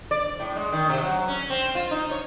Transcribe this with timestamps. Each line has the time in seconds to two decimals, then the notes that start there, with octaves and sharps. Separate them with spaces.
0.11 D5
0.40 A2
0.56 G#3
0.72 D#3
0.90 C3
1.03 F#3
1.28 C#4
1.50 C4
1.75 F4
1.91 D#4
2.11 C#5